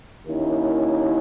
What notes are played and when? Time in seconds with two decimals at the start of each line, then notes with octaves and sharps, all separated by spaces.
0.25 D#2 D#3 A#3 C#4 E4